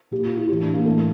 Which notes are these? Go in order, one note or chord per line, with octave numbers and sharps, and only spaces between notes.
A#2 G4
F4
E4
A2 E3 G4
D4
A#3
A2 E3 A3